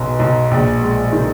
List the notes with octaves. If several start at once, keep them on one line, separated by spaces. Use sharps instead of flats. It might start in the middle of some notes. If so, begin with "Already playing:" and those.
Already playing: B1 B2 G#3
B1
A#1
G#3
D#3